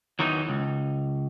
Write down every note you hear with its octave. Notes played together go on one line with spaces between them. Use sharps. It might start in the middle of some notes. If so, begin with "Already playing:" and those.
E2 D#3 E3 F#3 D#4
C#2